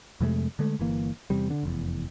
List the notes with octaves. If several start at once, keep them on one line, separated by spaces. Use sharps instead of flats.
F2 C3 G#3 A3
D3 G#3 A3
G1 E3 A#3
E2 C3 G3
D3
F1 E2